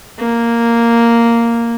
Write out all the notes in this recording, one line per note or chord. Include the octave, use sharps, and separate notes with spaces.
A#3